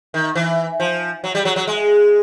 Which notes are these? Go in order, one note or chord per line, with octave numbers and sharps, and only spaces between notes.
D#3
E3
F3
F#3
G3
F#3
F#3
G#3